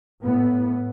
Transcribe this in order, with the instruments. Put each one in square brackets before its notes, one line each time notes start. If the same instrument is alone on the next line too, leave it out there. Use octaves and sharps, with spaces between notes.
[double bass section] A2 B3